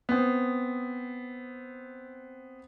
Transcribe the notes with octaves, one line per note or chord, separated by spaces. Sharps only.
B3 C4